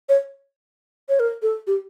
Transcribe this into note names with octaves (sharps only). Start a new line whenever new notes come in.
C#5
C#5
A#4
A4
G4